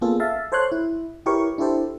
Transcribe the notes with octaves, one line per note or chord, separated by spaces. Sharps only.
A#3 B3 C#4 F4 G#4 A4
E5 F5 A5
A4 C5 C#5 C6 F#6
E4
E4 G4 A#4 B4 C#5 C#6
D4 E4 G4 A4 C5